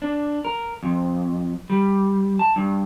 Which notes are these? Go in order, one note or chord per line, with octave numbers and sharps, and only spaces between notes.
D4
A#4
F2
G3
A5
G2